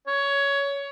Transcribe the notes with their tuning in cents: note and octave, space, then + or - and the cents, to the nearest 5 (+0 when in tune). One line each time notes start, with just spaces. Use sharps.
C#5 +15